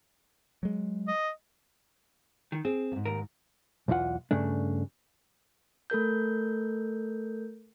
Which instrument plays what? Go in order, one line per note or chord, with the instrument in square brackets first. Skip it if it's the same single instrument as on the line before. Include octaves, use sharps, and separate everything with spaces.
[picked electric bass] F#3 G#3
[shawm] D#5
[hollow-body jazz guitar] D#3
[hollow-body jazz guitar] C4 [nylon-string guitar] G#4
[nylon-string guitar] F2 G#2
[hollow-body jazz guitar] D#2 A#4
B1 E2 E3 F4 F#5
G2 C#3 A3 D4
[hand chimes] A3 A4 A#4 G6